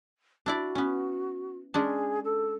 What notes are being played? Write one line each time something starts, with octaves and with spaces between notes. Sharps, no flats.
D4 E4 F#4 D5
B3 C#4
G#3 C#4 D4 G#4
A4